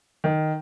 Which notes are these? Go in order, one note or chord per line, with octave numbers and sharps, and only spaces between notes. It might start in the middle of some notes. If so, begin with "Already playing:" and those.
D#3